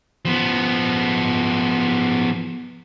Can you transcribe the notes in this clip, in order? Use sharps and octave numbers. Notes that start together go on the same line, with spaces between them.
F3 B3